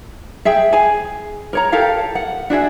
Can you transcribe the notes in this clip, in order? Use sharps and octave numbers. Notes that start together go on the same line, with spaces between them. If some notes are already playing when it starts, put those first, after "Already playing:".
G#4 E5 G5
G#4 G#5
A#4 C#5 A#5
G4 A4 A#4 F5
F#5
D4 F#4 G#4 E5